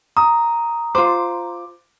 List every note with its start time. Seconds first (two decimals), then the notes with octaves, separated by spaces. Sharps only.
0.17 A#5 D#6
0.95 F4 C5 D6